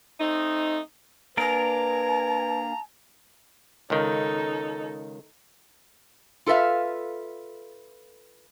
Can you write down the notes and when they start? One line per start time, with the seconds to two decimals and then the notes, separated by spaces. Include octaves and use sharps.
0.20 A3 C4 D#4
1.37 A#3 D4 A#4 B4 G#5 A#5
3.90 C#2 D#3 D#4 A4
6.46 F4 A4 B4 E5 F5